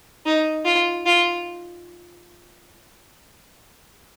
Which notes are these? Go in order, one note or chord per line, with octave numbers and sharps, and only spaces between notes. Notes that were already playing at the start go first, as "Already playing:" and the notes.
D#4
F4
F4